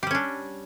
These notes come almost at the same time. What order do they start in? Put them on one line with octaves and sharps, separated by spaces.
G4 G3 C#4 D4